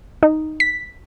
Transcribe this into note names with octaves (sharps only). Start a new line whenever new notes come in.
D#4
B6